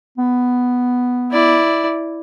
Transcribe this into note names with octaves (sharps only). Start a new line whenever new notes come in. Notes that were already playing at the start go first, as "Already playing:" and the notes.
B3
E4 D5